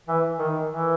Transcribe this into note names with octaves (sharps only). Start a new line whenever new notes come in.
E3
D#3
E3